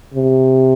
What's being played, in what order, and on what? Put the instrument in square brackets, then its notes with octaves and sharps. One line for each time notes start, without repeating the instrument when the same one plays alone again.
[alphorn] C3